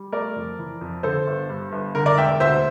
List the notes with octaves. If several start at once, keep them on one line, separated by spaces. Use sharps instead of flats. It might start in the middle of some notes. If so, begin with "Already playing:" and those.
Already playing: G3
A3 A#4 D5
F2
E3
F2
D3 A4 C5
G1
G2
G1
D3 A#4
A#4 D5
E1 E5 G5
D2 C5 E5